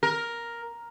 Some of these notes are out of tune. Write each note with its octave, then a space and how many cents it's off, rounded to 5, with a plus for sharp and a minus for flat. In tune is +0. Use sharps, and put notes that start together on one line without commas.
A#4 +5